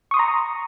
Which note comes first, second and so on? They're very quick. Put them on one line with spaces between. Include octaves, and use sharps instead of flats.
C#6 D#6 C6 A#5